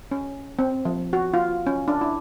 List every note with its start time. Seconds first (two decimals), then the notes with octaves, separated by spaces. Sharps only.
0.11 C#4
0.59 C4
0.85 F3
1.13 F#4
1.34 F4
1.67 C#4
1.88 D4
2.01 E4